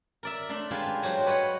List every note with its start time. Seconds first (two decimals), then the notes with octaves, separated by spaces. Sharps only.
0.23 A#4 D5 E5
0.49 A3 D4 C6
0.71 G#3 F4 G4 B4 C6
1.02 F#3 F#4 G4 C5
1.27 B4 C#5 D#5 F#5 B5